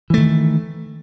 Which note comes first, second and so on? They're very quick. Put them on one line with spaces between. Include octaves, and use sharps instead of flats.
E3 A3 D#3